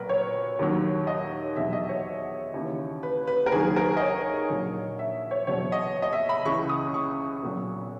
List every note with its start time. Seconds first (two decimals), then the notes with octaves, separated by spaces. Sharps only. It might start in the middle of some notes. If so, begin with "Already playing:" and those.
Already playing: B1 A#2 F#3 A#4 B4
0.09 C#5
0.59 D#2 D#3 F#3
1.07 D#5
1.56 E2 B2 F#3 E5
1.73 D#5
1.89 C#5
2.54 D#2 C#3 E3
3.03 B4
3.27 B4
3.46 A#4
3.52 D#2 D#3 F#3 G#4
3.76 A#4
3.97 D#5
4.01 C#5
4.50 A#1 A#2 F#3
4.99 E5
5.31 C#5
5.47 E2 B2 F#3 C#5
5.72 D#5
6.02 D#5
6.13 E5
6.29 B5
6.45 C#2 C#3 E3 C#6
6.69 D#6
6.94 C#6
7.43 B1 A#2 F#3